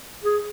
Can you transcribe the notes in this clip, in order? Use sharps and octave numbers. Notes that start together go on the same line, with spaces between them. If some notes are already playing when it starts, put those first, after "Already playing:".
G#4